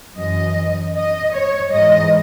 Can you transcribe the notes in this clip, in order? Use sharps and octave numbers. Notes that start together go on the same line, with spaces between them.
F#2 E3 D#5
D#5
C#5
G#2 E3 D#5